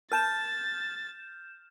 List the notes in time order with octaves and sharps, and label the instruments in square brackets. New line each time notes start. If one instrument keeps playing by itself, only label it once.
[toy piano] A#4 A5 [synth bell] F6 G6 E7 [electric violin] A6